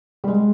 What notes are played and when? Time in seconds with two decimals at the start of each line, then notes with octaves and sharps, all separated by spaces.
0.24 G3
0.28 G#3